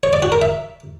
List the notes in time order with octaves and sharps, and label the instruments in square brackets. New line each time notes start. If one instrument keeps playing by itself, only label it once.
[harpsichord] C#5
D5
F#4
A#4
E5